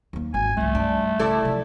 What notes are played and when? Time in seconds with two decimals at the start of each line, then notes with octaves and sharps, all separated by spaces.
0.13 D#2 A#3
0.34 G#1 G#5
0.57 C2 F3 A3
0.75 G2 D4
1.19 C#3 E4 A4 D5
1.42 C3 F3